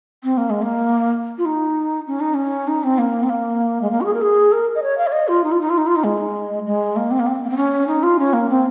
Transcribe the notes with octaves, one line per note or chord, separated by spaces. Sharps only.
C4
A#3
G#3
A#3
F4
D#4
C#4
D#4
C#4
D#4
C4
A#3
C4
A#3
G#3
A#3
F#4
G#4
A#4
G#4
A#4
D#5
C#5
F5
C#5
D#5
F4
D#4
F4
D#4
F4
D#4
F4
D#4
G#3
G#3
A#3
C4
A#3
C4
A#3
C4
C#4
D#4
F4
C#4
A#3
C4